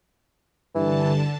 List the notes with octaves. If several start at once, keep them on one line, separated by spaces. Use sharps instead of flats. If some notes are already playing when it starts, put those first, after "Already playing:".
G2 D3 E3 A5